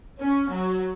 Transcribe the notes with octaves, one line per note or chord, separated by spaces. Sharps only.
C#4
F#3